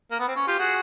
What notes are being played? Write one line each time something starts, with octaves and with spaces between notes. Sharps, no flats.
A#3
B3
C4
C#4
F4 G4
F#4 G#4